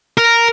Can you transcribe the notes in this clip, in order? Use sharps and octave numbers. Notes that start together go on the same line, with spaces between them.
A#4